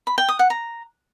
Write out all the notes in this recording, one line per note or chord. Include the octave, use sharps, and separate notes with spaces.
B5
G5
D#6
F#5
A#5